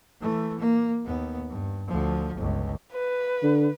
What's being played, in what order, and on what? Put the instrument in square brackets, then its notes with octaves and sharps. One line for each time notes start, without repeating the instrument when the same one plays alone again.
[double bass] E3 A3
A#3
D#2 B3
G2
D2 F3
G1 C#2
[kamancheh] B4
[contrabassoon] D3